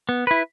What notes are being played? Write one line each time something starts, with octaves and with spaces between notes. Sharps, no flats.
B3
E4 B4